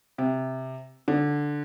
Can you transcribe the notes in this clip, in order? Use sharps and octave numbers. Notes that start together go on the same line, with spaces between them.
C3
D3